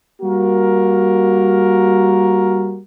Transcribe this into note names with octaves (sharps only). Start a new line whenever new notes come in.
G3 A#3 F#4 A#4